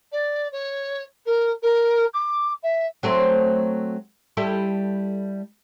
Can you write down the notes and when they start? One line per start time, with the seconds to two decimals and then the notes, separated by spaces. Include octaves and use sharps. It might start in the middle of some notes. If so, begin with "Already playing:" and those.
0.12 D5
0.52 C#5
1.26 A#4
1.62 A#4
2.13 D6
2.63 E5
3.03 F#3 A3 C4
4.37 G3 E4 A4